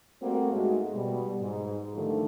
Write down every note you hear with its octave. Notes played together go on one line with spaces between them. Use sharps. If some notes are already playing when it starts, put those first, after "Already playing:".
G3 A3 A#3 C4 F#4
G#2 G#3 A3 F#4
B2 G3
G#2
D3 D#3 F3 G3 A3 D4